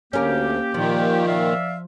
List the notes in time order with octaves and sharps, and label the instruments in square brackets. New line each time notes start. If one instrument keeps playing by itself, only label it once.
[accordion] D2 [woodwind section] A#3 G4 [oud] C#4 A#4
[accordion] A#2 D#3 [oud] F3
[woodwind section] D5 E5 F5